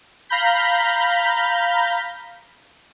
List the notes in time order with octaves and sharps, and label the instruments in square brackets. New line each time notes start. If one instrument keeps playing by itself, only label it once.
[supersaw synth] F5 A#5 B5 G6 B6